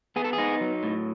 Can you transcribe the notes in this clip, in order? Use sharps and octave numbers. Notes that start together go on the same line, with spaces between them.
B3 G#4
A4
G#4
D#4
F#3
A2